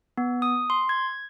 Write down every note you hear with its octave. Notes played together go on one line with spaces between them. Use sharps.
B3
D#6
C6
G#6